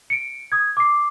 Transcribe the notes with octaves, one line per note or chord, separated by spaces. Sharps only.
C#7 D7
D#6 G#6
D6 C7